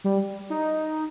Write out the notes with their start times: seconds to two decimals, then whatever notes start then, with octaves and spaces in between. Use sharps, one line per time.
0.04 G3
0.50 D#4